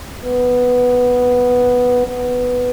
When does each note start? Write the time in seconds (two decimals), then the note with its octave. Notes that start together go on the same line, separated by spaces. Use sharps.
0.25 B3
2.07 B3